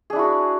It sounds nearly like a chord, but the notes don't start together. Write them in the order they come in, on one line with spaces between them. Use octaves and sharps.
G#4 D4 E4 F#4